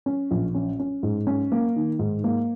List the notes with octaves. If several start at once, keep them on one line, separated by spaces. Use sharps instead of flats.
C#4
A#1
C#4
C#4
G#2
C#4
A#3
D#3
G#2
A#3